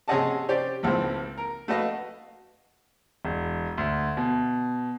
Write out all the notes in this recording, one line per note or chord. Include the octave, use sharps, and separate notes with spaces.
C3 C#4 G#4 D#5 F#5 A5
C#4 G4 C5 D5
G#1 C#2 A2 C4
A#4
A3 F#4 B4 D#5 F5
E1
D2
B2